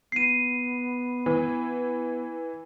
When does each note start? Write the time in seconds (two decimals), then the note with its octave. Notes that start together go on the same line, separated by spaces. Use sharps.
0.12 B3 C7 D#7
1.26 E3